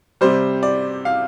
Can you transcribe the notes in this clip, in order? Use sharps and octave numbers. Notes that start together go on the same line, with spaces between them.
C3 G3 C5
D5
F5